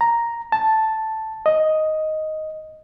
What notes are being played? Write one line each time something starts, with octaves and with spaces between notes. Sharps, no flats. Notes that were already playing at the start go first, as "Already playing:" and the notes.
A#5
A5
D#5